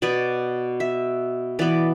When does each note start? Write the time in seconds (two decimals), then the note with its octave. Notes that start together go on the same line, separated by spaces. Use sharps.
0.02 B2 B3 D5
0.80 E5
1.59 E3 B3 D5